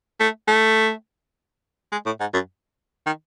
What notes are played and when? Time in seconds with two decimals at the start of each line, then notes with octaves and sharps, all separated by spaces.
0.20 A3
0.48 A3
1.92 G#3
2.06 A2
2.20 G#2
2.34 F#2
3.06 D#3